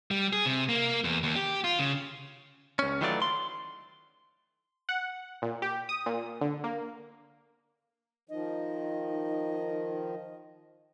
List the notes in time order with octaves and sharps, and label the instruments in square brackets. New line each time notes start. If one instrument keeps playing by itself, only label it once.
[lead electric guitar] G3
G#4
C3
A#3
E2
D#2
G4
F4
C#3
[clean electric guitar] C#2 C#4
D#3 E3 F#3 A3 F4 D5
C6
[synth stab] F#5
A#2
G4
D#6
A#2
D3
A#3
[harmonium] D#3 F3 [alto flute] D#4 [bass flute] D#5